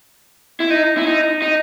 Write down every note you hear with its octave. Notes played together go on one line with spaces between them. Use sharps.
E4
D#4
E4
D#4
D#4